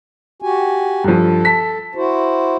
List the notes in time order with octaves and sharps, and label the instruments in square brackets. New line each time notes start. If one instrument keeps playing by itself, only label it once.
[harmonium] F#4 G4 G#5
[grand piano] G2 F3 [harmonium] A4
[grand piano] A5 B6
[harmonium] E4 F#4 C5